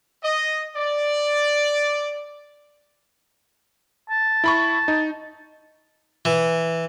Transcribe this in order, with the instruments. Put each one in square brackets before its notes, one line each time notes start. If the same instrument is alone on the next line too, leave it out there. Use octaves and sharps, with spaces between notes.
[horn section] D#5
D5
[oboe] A5
[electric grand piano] E4 B5 C#6
D#4
[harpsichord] E3